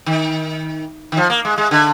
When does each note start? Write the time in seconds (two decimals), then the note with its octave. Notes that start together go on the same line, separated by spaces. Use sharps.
0.06 D#3
1.12 D#3
1.17 F3
1.30 A#3
1.45 G#3
1.58 G#3
1.71 D3